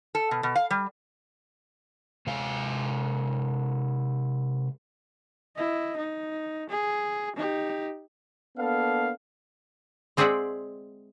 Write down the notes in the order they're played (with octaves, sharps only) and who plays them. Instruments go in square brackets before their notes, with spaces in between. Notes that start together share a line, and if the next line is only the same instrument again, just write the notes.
[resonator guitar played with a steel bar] A4
B2
B2
F5
G3
[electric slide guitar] C3 G#3 F5 G#5
[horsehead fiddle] E4 D#5
D#4
G#4
D#4 G4
[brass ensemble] A#3 B3 D4 A4 F5
[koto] G#3 C4 G#4 D5 E5 F#5